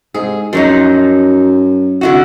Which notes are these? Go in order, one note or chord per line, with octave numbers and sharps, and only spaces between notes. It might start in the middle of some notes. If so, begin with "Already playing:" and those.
G#2 G#4
F#2 F3 F#3 D#4
D3 E4 F#4